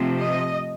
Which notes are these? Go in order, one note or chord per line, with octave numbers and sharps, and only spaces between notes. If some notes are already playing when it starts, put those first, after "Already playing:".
Already playing: C3 F3 A3
D#5